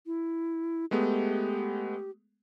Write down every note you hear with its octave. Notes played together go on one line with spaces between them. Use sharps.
E4
G#3 A3 B3 G4